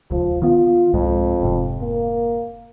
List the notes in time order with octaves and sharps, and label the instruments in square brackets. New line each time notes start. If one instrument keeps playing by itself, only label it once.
[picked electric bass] D#1 C#2 [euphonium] F3
[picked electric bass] D#3 B3 [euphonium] F4
[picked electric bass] C2 G#2 G#3 [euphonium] F2
[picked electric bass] F1 G#2 C3
[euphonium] A#3